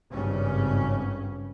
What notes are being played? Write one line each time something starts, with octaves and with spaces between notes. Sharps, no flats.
G#1 G2 C#3 C#4